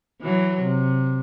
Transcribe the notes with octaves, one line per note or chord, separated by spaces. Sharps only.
E3 F#3
C3